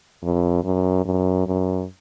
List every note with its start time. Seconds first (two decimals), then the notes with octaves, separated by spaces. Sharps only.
0.23 F2
0.64 F#2
1.06 F#2
1.47 F#2